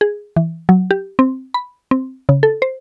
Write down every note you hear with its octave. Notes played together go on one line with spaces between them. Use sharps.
G#4
E3
F#3
G4
C4
B5
C4
C#3
A4
C5